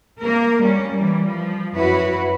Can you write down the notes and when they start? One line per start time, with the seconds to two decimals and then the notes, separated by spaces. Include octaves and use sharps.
0.20 A#3 A#4
0.62 G3 C#4
0.94 E3 G3
1.24 F3
1.75 F#2 E4 F#4 B4 C#5